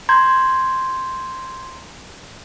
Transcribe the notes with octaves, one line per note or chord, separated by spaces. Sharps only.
A#5 C6 G6 G#6